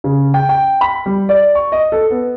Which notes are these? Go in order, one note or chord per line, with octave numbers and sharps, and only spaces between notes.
C#3
G5
G5
B5
G3
D5
C#6
D#5
A4
B3